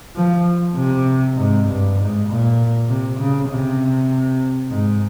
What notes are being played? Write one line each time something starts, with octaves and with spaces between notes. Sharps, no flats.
F3
C3
G#2
G2
G#2
A#2
C3
C#3
C3
G#2